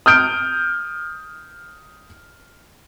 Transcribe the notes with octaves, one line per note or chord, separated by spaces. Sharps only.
D#6 F6 G6 D7